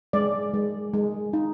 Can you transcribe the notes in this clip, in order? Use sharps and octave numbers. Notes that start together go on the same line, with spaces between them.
G#3 D5
G#3
G#3
D#4